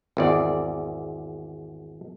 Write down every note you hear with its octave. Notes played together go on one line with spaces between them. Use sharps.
G#1 E2 D5